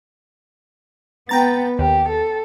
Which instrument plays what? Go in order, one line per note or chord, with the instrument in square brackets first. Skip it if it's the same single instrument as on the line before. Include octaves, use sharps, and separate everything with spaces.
[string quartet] B3 [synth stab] G5 A#5 A6
[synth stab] D#2 [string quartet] G4
[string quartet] A4